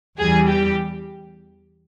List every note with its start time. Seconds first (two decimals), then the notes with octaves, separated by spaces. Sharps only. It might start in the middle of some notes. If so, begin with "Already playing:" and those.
0.18 E2 E3 G3 G#4
0.48 G4